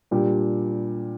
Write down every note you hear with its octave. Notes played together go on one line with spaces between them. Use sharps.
A#2 G3 D4 G4